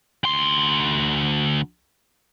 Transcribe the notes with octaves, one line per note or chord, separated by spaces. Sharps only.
D2 C6